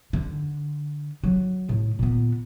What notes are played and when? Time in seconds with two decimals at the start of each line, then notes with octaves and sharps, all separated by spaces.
0.13 D3
1.24 F#3
1.69 A2
1.99 A#2 B3